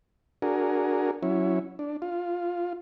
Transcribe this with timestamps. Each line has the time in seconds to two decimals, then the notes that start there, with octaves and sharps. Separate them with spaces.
0.42 D4 F#4 G#4 A#4
1.23 F#3 C#4 E4
1.79 D4
2.02 F4